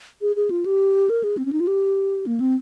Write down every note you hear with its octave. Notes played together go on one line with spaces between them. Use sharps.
G#4
G#4
F4
G4
A#4
G#4
C4
C#4
D#4
F4
G4
A#3
C4